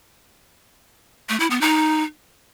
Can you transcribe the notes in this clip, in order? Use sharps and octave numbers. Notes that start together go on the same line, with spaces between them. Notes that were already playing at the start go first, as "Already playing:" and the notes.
A3
E4
B3
D#4